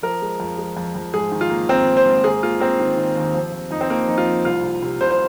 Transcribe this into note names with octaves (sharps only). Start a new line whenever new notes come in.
F3 A#4
G#3
F2
G#3
F2
F2
G#2 G#4
D#3
F4
A#3
A#3 C4
A#3
C5
G#2
A#3 G#4
A#3 F4
A#3 C4
D#3
D#3
D#2
F3
F3
F2 D#4
C4
F3 A#3
F3 D#4
F4
F3
C2 F4
C3
C3
C2 C5
C5